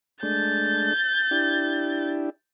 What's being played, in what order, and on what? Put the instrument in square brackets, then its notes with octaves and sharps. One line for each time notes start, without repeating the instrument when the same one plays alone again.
[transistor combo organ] G#3 A3 D4 [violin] G6 A6
[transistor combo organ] D4 E4 G4